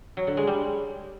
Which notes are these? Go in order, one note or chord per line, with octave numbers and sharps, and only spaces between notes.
F#3
D3
G#3
G3